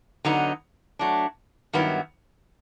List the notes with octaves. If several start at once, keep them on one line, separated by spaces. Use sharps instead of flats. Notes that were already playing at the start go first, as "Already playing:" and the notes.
D3 F#3 B3 D#4
F#3 A3 D4
G2 D#3 F#3 B3 E4